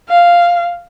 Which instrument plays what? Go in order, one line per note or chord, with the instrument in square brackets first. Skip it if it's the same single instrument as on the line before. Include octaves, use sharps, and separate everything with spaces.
[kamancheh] F5